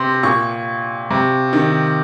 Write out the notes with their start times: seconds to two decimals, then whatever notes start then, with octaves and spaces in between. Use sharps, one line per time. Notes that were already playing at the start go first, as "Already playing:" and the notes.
Already playing: C3 C6
0.23 A#2 C#6
1.10 C3
1.53 D#3